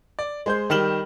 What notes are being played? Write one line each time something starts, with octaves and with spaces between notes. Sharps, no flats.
D5
G#3 C5 G6
D#3 G3 F6 E7 F#7 G7